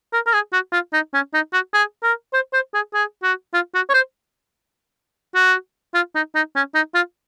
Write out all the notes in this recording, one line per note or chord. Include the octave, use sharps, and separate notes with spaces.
A#4
A#4
G#4
F#4
F4
D#4
C#4
D#4
F#4
G#4
A#4
C5
C5
G#4
G#4
F#4
F4
F#4
C#5
C5
F#4
F4
D#4
D#4
C#4
D#4
F4